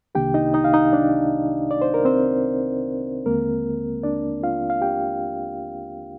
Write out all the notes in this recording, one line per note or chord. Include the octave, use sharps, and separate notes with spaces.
C2 C3 D#3 A#3 D4 G4 G5
D#4 D#5
D#4 D#5
F5
D#4 D#5
D4 D5
D5
C5
A#4
C4 C5
D#2 D3 G#3 A#3 C4 A#4
D4 D5
F4 F5
F5
G4 G5